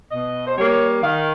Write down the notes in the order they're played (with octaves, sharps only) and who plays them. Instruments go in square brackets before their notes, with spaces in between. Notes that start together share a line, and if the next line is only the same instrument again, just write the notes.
[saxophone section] B2 D#5
C5
G3 A#3 C#5
D#3 F5